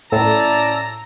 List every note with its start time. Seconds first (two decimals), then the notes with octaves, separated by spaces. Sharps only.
0.12 A2 C#4 E4 D5 A5 A#5 E6